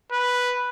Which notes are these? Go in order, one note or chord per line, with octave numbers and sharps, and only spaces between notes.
B4